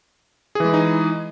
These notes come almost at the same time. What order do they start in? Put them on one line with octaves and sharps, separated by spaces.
G#4 E3 G#3 E4 D#4